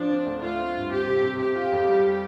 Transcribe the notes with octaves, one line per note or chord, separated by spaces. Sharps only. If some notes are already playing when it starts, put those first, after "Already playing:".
Already playing: F3 D4
C4
D2
A3 F4
C4
G2
C4 G4
C3
C3
C4 G4
F4
F2
G3